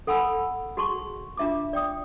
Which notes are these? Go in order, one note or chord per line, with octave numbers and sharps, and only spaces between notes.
A4 F#5 G#5 B5 E6
F#4 G#4 A5 C6 C#6
D4 F4 E5 A5 D6
D5 G5 D#6